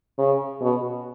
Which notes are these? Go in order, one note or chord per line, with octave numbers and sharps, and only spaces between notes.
C#3
B2